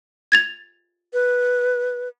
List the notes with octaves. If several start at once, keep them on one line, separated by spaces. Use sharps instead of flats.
G#6 A6 F7
B4